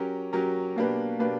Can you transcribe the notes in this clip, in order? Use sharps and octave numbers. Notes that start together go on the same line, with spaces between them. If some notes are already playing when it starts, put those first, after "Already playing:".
Already playing: F#3 C#4 G4 A#4
F#3 C#4 G4 A#4
B2 A#3 D4 G4 B4
B2 A#3 D4 G4 B4